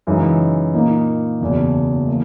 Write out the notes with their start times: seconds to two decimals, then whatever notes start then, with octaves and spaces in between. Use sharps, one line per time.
0.07 F#2 C#3 E3 G#3 D#4
0.74 A#2 A#3 D#4
1.41 F#1 E2 B2
2.08 E3 A#3